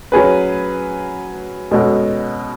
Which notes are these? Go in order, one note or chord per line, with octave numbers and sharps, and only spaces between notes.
F#3 C#4 G#4 B4
B2 G#3 C#4 F#4 A4